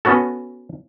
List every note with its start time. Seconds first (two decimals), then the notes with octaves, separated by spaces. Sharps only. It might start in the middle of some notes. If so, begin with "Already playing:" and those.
0.05 B3 C#4 F#4 A4